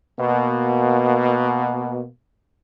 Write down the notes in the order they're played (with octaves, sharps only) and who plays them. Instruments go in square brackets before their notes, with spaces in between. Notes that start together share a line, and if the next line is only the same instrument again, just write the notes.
[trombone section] B2 A#3